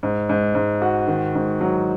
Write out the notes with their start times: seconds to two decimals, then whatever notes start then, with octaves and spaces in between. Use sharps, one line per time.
0.03 G#2
0.29 G#2
0.55 G#2
0.82 F#4
1.08 D#3
1.35 G#2
1.61 F#3